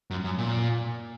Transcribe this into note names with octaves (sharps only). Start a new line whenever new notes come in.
F#2
F#2
A#2